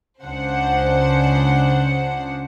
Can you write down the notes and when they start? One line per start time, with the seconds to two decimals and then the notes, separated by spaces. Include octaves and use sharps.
0.24 C#2 C#3 D4 C5 F#5